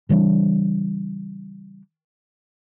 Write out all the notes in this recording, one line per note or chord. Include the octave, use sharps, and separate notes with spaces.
C#3 E3 G3 D4